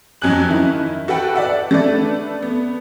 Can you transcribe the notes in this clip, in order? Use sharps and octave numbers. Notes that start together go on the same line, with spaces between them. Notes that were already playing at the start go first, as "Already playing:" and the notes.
F2 F#3 C#4 G#5 F#6 F#7
D#3 C#4 E4
F#4 A4 B4 F#5 G5
D5 E5 F#5 E6
A3 D4 A4 B4 D5
B3